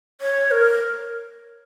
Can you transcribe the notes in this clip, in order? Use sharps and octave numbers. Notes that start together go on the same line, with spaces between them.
C#5
A#4